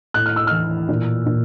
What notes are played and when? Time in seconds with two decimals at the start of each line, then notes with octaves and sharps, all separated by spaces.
0.14 A2 F#6
0.26 F6
0.36 E6
0.47 E3 F6
0.89 A#2
1.26 A#2